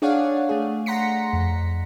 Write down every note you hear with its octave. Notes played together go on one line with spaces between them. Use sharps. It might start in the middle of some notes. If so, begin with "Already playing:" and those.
D4 G#4 C#5 D5 F5 F#5
A3 G#4
F#5 A#5 C6 A#6 B6 C#7
F2